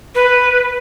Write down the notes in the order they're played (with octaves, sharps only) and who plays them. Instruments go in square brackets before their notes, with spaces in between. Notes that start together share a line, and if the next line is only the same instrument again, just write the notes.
[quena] B4